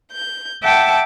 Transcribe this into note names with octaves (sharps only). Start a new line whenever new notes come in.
G6
E5 F#5 G5 A5 D6